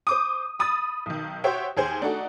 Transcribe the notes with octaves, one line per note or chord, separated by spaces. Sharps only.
C5 D6 D#6
B5 D#6 E6 A6
B1 D#3
F#4 G4 C5 C#5 E5 G5
D#2 G#4 C5 G#5
A3 D4 D#4 F#4 A4